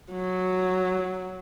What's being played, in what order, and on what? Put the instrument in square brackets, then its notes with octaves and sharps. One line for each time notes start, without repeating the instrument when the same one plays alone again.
[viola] F#3